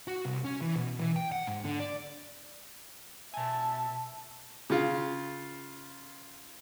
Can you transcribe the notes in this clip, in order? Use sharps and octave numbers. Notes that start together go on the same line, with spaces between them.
F#4
C2
C#4
E3
B2
E3
G5
F#5
G#2
D3
D5
B2 E5 G#5 A5
C#3 F4